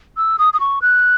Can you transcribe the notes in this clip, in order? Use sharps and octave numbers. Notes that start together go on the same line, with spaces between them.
E6
D#6
D#6
C#6
F#6